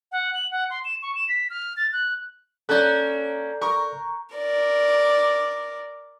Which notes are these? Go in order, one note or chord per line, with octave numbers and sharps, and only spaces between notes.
F#5
F#7
F#5
C6
E7
C#6
E7
B6
F6
A6
F#6
A#3 C#4 A4 D5 F#6 G6
A#4 C#6
A#4 D5